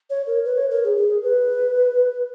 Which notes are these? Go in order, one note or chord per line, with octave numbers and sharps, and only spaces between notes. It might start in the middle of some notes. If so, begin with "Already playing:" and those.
C#5
A#4
B4
C#5
A#4
G#4
G#4
B4